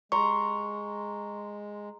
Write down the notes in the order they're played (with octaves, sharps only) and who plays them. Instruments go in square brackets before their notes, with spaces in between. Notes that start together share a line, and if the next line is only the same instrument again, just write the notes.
[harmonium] G#3 [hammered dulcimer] A#5 C6 [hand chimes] C#6